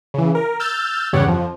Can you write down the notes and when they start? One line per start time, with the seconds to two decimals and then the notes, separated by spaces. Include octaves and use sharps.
0.14 C#3 E3
0.35 A#4
0.59 E6 F6 G6 A6
1.13 E2 G2 C#3 G4 C#5 F#5
1.27 F2 F3